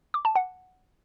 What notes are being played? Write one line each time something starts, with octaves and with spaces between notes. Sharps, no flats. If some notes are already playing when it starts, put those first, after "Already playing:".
D6
A5
F#5